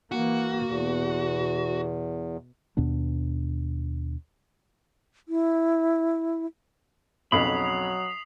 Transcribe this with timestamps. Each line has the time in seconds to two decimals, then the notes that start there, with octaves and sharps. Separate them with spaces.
0.12 E3 A#3 F#4
0.67 E2 B2
2.77 D#2 B2 B3 D4
5.28 E4
7.32 B1 F2 C#3 F#3 B5 D#6 C7 F7